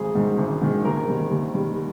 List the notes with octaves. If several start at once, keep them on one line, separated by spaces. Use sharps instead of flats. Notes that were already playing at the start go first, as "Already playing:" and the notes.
Already playing: G#1 G#4
G#2 D#3
G#1
G#2 D#3
D#2 A#4
D#3 G3
D#2
D#3 G3